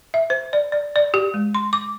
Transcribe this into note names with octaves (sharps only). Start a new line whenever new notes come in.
E5
C5
D5
D5
D5
G4
G#3
C6
D6